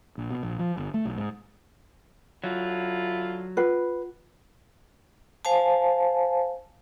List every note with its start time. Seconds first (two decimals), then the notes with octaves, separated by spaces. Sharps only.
0.18 A#1
0.30 B2
0.43 A#1
0.59 F3
0.77 G1
0.94 A3
1.05 B1
1.18 G#2
2.44 D3 F#3 E4 F4
3.57 F4 B4 F#5
5.45 C5 F5 G#5 A5